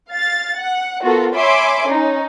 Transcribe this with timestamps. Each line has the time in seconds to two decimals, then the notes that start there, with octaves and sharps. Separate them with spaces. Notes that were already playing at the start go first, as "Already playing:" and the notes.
0.10 F5 A6
0.57 F#5
1.02 B3 F4 F#4 A4 A#4
1.36 C#5 E5 G#5 B5 C6 D6
1.86 C#4 D#4